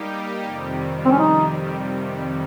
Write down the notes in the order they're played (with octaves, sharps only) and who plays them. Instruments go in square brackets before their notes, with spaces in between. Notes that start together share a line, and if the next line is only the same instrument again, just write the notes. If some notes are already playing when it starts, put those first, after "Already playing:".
Already playing: [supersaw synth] G3 A#3 D#4 G4
F2 C3 D#3 G3
[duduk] C4
C#4
D#4